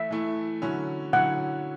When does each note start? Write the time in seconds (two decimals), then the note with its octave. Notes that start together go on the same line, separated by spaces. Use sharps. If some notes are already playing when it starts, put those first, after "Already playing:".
Already playing: E3 A3 E4 E5
0.11 E3 A3 E4
0.62 D3 F#3 C#4 E4
1.13 D3 F#3 C#4 E4 F#5